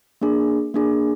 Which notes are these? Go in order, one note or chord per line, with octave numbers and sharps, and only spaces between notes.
A#3 D4 G#4
A#3 D4 G#4